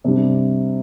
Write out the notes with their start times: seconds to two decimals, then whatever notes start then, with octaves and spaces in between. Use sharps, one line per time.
0.04 C3 G3 D4